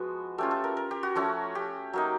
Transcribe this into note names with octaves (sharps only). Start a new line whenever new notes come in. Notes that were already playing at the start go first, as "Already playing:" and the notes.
Already playing: F3 G#3 B3 F#4
A3 C#4 F4 G4
A4
A#4
A#4
G4
F#4
F3 A3 C#4 F#4
G4
F#3 A#3 D#4